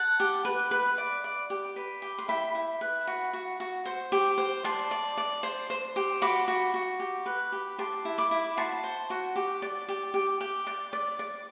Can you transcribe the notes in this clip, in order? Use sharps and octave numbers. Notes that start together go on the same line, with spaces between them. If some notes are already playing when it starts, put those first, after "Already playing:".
Already playing: F#5 A5
G4
B4
B4
D5
D5
G4
B4
G4
C6
E4 G5 B5
E4
B4
F#4
F#4
F#4
C5
G4
C5
D5 A5 C6
D5
D5
C5
C5
G4
F#4 B5 D6
F#4
F#4
G4
B4
G4
G4 A5 C6
E4
B5 D6
E4
F#4 A5 C6
C5
F#4
G4
D5
G4
G4
G4
D5
D5
D5